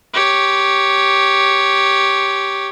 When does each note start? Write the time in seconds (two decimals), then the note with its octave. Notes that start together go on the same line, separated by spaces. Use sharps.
0.14 G4 C#5